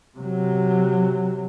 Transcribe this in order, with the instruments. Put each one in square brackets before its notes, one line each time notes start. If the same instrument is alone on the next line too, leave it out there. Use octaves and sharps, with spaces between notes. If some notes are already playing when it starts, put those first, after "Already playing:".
[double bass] C3 F#3